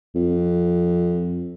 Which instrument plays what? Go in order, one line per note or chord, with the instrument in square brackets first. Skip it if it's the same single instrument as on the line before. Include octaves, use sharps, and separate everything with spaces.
[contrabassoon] F2